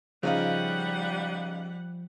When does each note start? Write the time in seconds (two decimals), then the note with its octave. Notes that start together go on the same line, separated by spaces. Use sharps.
0.23 C#3 F3 G3 D#4 F4 F#5